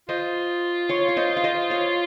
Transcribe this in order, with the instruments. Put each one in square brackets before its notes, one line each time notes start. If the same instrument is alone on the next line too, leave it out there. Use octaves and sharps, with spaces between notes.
[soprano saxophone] F4 [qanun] C5 D#5
[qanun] C#5 F5
C#5
C5 D#5
F5
C5 D#5
C#5 F5